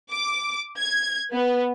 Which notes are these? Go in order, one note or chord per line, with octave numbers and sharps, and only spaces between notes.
D6
G#6
B3